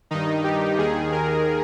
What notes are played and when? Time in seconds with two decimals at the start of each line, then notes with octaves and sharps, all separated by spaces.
0.11 G2 D#3 D#4
0.44 G4
0.78 D#2 D#3 G#4
1.12 A#4